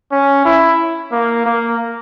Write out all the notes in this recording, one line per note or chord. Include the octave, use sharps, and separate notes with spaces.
C#4
E4
A#3
A#3